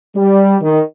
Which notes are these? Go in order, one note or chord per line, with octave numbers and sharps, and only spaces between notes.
G3
D#3